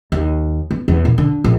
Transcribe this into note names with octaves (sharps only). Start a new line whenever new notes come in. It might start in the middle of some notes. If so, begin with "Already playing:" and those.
D#2
B3
E2
A#2
D3
A#1